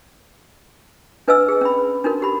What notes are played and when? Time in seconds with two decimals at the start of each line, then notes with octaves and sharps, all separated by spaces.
1.28 D4 B4 D#5 F5 G#5 E6
1.48 G#4
1.61 C#4 B5
2.04 D4 D#4 F#4 A#4
2.22 G4 B5